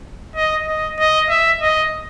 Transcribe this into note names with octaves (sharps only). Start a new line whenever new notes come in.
D#5
D#5
D#5
E5
D#5